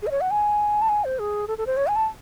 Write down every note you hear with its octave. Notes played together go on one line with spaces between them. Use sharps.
G#4
D#5
C#5
F#5
G#5
A5
G#5
C5
G#4
A4
A4
C5
C#5
G#5
A5